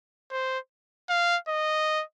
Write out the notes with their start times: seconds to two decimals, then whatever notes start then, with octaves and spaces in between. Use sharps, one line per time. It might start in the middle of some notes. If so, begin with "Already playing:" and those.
0.31 C5
1.10 F5
1.48 D#5